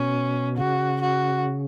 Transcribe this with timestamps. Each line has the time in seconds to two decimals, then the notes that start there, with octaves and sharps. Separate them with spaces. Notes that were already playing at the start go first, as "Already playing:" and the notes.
Already playing: B2 C#4
0.57 C#3 F#4
1.01 F#4